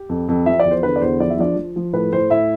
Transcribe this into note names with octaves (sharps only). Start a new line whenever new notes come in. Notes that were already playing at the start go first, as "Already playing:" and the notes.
Already playing: G4
F2
F2
F3 E5
D5
E2
C5
D3 B4
D5
E2 C5
F3 D5
E5
F3 D4 D5
F3
F3
A2 B4
A2 C5
A2 E4 E5